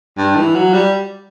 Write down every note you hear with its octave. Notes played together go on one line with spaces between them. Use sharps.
G2
E3
F#3
G3